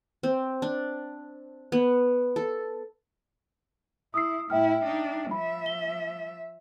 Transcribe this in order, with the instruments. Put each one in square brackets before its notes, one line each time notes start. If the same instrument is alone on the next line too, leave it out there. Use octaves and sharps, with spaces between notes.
[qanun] C4
D4
B3
A4
[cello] E4 [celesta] D#6 E6 C7
[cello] A2 E4 [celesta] E5 G5 F6
[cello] D4 D#4
[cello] F3 E5 [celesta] B5
[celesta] G7